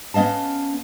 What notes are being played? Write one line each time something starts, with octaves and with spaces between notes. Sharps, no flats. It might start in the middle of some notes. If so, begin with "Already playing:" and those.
B3 C#4 D#5 F5 A5